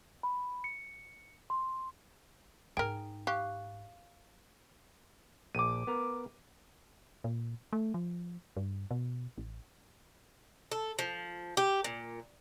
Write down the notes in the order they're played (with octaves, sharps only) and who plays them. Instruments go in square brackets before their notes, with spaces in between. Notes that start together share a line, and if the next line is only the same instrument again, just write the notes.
[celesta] B5
C#7
C6
[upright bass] G#2 D#4 [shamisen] G#4 A#4 [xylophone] G5
[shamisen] G4 [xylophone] F5 C#6 F#6
[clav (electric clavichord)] A#1 [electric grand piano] D6 D#7
[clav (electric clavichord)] B3 A#4
[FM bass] A#2
A3
F3
G2
B2
A1
[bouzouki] A4
F3
G4
A#2